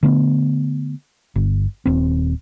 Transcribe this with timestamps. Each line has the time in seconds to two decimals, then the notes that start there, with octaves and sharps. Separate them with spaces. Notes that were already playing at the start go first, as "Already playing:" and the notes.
0.03 D3 A3 B3
1.36 G1
1.86 D#1 C4